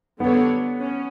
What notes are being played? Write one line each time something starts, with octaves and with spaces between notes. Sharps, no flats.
D3 G3 B3 D4 A4 C#5
C#4